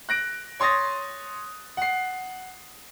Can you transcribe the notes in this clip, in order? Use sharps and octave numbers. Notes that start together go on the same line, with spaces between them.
F#6 A#6 D7
C#5 C6 D#6 A6 A#6
F#5 C7